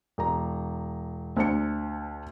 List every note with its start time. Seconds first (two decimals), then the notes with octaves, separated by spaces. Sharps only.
0.18 E1 A#5
1.37 D2 D4 C5 A5 C#7